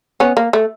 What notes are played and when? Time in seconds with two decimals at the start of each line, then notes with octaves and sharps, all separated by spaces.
0.20 B3 C#4
0.37 A#3
0.53 A3